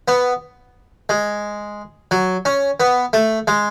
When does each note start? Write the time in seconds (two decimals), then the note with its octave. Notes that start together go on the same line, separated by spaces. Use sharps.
0.08 B3
1.09 G#3
2.11 F#3
2.45 C#4
2.80 B3
3.13 A3
3.47 G#3